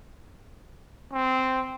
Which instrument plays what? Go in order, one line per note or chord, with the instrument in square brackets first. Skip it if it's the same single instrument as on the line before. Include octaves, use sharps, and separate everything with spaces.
[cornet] C4